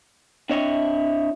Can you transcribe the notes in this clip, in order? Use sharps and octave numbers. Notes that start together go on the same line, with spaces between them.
C4 D4 E4 C#5 D#5 E5